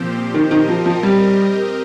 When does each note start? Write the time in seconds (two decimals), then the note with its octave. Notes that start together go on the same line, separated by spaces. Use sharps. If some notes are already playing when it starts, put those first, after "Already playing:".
Already playing: A#2 F3 C4 G4 C5
0.33 D#3 C4 G4 A#4 D#5
0.51 D#3
0.69 F3
0.86 F3
1.03 G3